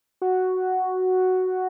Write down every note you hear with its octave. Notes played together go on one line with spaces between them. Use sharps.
F#4